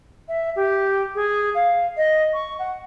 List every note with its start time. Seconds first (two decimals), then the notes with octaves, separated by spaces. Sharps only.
0.29 E5
0.56 G4
1.15 G#4
1.55 F5
1.97 D#5
2.34 C#6
2.59 F#5